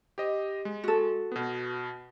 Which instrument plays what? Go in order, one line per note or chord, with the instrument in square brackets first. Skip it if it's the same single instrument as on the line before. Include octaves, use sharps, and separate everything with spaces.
[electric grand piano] G4 C5 D#5
G#3
[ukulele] F#4 A4
[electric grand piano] B2 B3